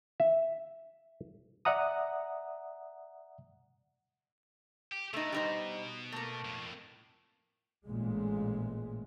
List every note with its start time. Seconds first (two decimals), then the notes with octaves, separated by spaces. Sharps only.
0.20 E5
1.65 D5 E5 F#5 A#5 D#6
4.92 G4
5.13 B2 A3 D#4
5.32 G3 D#4 C5
6.12 A3 A#3
6.45 F2 A2
7.85 A1 A#2 G#3